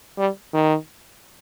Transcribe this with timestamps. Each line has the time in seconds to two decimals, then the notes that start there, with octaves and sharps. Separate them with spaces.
0.18 G3
0.54 D#3